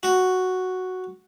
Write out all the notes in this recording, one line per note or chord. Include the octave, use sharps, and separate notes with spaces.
F#4